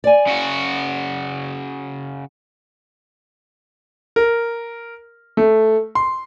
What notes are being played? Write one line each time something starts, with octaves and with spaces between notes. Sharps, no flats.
D5 G#5
C#3 F#4
A#4
A3
C6